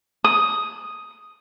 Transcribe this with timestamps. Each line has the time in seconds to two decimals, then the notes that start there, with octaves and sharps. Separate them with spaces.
0.24 D#6